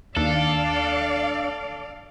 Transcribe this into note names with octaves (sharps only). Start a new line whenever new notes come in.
D#2 D4 A4 D5 F5